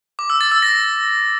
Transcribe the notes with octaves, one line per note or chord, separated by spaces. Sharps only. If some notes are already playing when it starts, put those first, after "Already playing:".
D6
E6
A6
E6
A#6